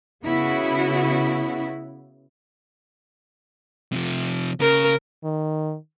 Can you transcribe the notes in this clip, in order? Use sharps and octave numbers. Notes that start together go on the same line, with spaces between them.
C#3 B3 E4 F#4
C3 F3
C#3 A#4
D#3